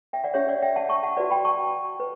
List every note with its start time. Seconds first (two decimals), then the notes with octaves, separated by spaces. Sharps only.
0.13 E5 G5
0.24 D5 F#5
0.34 C#4 G4 C#5 E5
0.48 D5 F#5
0.62 E5 G5
0.76 F#5 A5
0.89 A5 C#6
1.03 F#5 A5
1.16 F#4 B4 D5 F#5
1.31 G5 B5
1.45 A5 C#6
2.00 B4